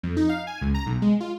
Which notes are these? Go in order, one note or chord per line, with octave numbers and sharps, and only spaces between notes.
F2
D#4
F5
G#5
C#2
A#5
B1
G#3
F4